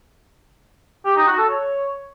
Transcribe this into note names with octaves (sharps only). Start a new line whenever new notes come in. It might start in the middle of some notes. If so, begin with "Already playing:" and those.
G4
D#4
F#4
A4
C#5